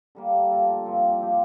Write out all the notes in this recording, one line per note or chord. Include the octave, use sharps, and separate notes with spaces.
D3 G3 A#3
F3 A#3 F4 A4
G2 F3 C4
F3 C4 G4